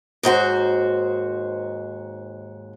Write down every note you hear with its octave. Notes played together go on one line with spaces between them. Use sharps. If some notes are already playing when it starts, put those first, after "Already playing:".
D#2 G#2 F#4 C5